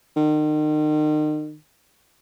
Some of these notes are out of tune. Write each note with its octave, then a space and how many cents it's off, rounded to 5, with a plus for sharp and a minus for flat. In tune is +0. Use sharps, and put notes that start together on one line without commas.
D#3 -35